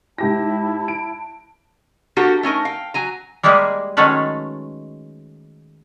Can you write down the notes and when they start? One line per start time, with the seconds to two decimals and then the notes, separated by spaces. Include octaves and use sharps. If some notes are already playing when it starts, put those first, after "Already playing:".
0.18 G#2 E4 G4 A5 A#6
0.88 D7
2.16 A#3 D4 F#4 G4 A4
2.43 A3 C#4 D#4 A#4
2.65 F5 G5
2.94 F#3 G#5 A#5
3.43 G3 G#3 A#3 E4 G4 G#4
3.97 D#3 F#3 G#3 A3 C#4 B4